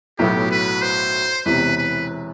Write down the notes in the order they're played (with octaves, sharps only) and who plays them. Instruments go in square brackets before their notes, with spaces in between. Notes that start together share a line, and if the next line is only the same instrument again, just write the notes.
[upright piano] B1 A2 F#3 B3 E4 [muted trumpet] G4
[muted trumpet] B4
C5
[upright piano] E1 E2 C3 E3 [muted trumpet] B4
[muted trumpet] B4